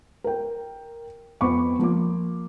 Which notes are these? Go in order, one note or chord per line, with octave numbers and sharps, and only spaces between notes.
A#4 G5
F2 B3 C5 B5 C#6 D6
F3 A#3 D6